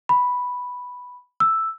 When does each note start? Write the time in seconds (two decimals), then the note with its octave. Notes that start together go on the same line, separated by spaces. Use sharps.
0.09 B5
1.40 E6